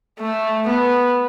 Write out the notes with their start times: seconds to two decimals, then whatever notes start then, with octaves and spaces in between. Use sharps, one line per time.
0.20 A3
0.68 B3